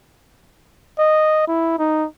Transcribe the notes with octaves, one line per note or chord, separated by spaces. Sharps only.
D#5
E4
D#4